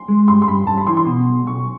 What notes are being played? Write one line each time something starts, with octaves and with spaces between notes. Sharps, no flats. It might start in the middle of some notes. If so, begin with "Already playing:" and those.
Already playing: C6
G#3
G2 C6
C6
G2 B5
G2 A5
B5
E3 C6
C6
B2
B1
B1 C#6